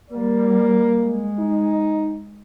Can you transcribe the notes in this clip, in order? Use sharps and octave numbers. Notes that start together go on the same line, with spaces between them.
G3 A#3
G#3
D#4